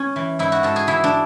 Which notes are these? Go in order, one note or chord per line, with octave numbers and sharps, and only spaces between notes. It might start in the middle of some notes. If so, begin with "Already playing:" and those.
Already playing: C#4
E3
G#2 E4
F#4
G#2 A4
G#4
E3 E4
D4